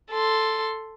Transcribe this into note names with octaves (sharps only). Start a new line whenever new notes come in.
A4 C6